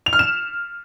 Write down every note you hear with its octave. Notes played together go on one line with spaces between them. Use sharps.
F7
F6
E7